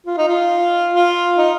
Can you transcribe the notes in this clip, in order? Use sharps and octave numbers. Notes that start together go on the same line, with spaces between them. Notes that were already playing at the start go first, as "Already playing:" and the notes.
F4
D#4
F4
F4
D#4